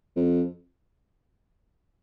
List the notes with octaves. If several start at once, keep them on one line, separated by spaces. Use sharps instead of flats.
F2